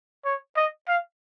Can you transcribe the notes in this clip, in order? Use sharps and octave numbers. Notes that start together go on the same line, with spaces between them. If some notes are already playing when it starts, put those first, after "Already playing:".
C#5
D#5
F5